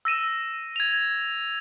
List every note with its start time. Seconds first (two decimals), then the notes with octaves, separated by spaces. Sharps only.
0.05 E6 A#6 D#7 E7
0.76 G#6 F7